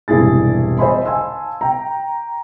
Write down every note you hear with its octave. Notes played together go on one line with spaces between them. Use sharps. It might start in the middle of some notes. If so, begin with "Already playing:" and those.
E1 G2 C3 E4 G#4 A6
C5 D#5 E5 G#5 B5 C6
F5 G#5 A5 C6 E6
G5 A#5